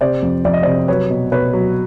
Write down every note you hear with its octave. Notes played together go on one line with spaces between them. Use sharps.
C3 C5 D5
F2
F2 D5
D#5
C3 C5 D5
F#3 B4 C#5
B2
B2 B4 C#5
F#3